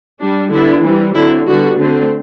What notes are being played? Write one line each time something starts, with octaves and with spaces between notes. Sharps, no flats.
G3 D4
D3 G3 B3 D4 E4
E3 G3 C4
D3 F#3 C4 E4
D3 G3 B3 D4 F#4
D3 A3 C4